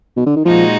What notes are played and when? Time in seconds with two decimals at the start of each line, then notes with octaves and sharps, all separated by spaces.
0.17 B2
0.26 D3
0.36 D#3
0.45 A#2 F3 G#3 D#4 F#4